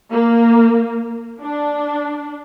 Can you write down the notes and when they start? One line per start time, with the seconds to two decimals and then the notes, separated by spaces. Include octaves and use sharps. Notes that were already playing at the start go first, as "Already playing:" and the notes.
0.11 A#3
1.41 D4